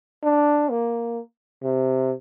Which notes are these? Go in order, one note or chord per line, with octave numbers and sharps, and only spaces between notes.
D4
A#3
C3